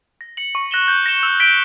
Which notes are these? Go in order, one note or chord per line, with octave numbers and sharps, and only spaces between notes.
A#6
C#7 F#7
C#6
F#6 A#6 E7 G7
G6
A#6 C#7 E7 G7
E6
G6 B6 D7 G7